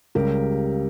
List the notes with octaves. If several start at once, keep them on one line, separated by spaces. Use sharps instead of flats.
C#2 C#3 G3 G4 A#4